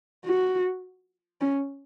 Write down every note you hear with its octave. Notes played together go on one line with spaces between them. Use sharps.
F#4
C#4